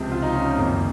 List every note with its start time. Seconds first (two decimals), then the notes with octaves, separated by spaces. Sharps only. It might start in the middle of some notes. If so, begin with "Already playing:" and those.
Already playing: C#2 C3 F3 C4
0.12 F4
0.23 D#4
0.34 C#4
0.46 C4
0.57 F#1 F2 D#3 A#3